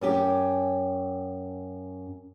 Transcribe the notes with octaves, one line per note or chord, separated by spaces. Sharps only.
F#2 C#4 G4